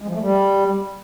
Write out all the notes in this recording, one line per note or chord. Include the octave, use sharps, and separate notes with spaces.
G#3
F3
A3
G3